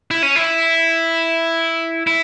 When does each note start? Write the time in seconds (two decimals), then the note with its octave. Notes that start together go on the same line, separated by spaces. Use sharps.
0.11 E4
0.23 C#4
0.36 E4
2.07 E4